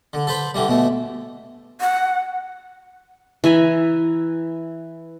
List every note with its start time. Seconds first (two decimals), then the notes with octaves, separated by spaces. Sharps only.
0.13 D3
0.27 A4 B4 C5 B5
0.54 D3 E3 G3
0.68 B2 A3
1.81 F#5
3.44 E3 E5 G#5 A#5